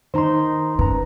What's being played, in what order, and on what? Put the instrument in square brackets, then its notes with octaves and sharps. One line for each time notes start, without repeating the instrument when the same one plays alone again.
[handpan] D#3 D#4 [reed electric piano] C5 A#5 C6
[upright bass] C#3 [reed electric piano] B4 A#5